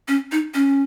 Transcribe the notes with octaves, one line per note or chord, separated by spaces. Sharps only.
C#4
D#4
C#4